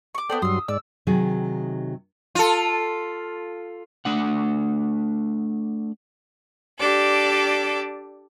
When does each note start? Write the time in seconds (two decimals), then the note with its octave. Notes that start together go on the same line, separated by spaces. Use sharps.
0.15 C#6 D6
0.30 B3 A4 C5 D5 G5
0.42 G2 F#3 C6 D#6 E6
0.68 G#2 D5 E6
1.07 C3 D#3 F#3 D#4 G#4
2.35 F4 A4
4.05 A3 D4 F#5
6.80 D4 G4 A4 D5